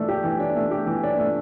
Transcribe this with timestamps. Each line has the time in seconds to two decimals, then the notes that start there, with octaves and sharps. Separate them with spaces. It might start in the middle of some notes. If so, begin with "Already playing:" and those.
Already playing: E3 A3 D4
0.08 G4
0.24 E3
0.40 D4
0.56 A3
0.71 G4
0.86 E3
1.03 D4
1.19 A3